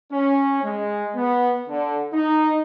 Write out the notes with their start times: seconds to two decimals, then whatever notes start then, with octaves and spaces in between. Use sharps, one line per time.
0.12 C#4
0.63 G#3
1.15 B3
1.69 D3
2.13 D#4